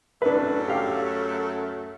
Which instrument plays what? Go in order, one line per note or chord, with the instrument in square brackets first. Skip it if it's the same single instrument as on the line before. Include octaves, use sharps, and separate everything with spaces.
[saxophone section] F#2 F#3 A3 [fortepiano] D4 B4
[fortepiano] G4 F5